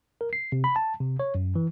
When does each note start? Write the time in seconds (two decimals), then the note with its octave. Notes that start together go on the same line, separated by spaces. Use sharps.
0.21 A#4
0.33 C7
0.52 C3
0.64 B5
0.76 A5
1.00 C3
1.20 C#5
1.35 F#2
1.56 E3